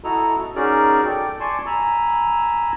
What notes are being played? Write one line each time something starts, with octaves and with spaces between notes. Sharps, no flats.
E4 F#4 A4 D#5 A#5
C#4 D#4 F#4 G#4 A#4 D5
A4 D5 G5
D5 G#5 A5 C6 C#6
G#5 A#5 B5 E6